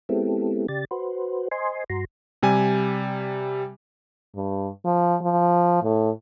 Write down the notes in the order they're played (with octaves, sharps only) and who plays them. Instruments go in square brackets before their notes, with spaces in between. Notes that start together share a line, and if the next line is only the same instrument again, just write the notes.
[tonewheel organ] G#3 B3 C4 E4 G4 A4
C#3 G4 D5 A6
F#4 B4 C5
C5 D#5 G#5 C6
G2 F#4 A#5 C6
[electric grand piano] C3 G3 G#5
[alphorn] G2
F3
F3
A2